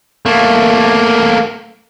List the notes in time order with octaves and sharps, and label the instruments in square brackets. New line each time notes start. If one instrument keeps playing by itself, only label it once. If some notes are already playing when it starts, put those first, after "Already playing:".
[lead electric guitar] A3 A#3